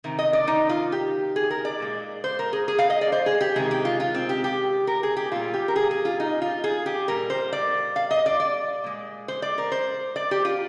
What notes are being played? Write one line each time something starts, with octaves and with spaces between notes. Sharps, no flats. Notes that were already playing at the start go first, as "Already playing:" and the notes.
C3 D#3
D#5
D5
D#4
F4
G4
G#4
A#4
D5
A#2 G#3
C5
A#4
G#4
G#4
F5
D#5
D5
C5
G#4
G4
C3 D#3 G#3 G#4
G4
F4
F4
C4
G4
G4
A#4
G#4
G4
A#2 G3 F4
G4
A#4
G#4
G#4
F4
D#4
F4
G#4
G4
A#2 G3 A#4
C5
D5
F5
D#5
D5
D5
A#2 G#3
C5
D5
A#4
C5
D5
G4
F4